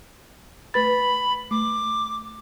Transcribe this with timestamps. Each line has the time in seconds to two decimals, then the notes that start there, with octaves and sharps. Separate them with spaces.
0.74 A3 B4 B5 A6
1.51 A3 D6